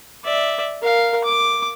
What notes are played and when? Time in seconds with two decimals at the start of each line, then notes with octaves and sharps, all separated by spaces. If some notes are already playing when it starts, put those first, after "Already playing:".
0.24 D5 E5
0.82 A#4 F5
1.24 D6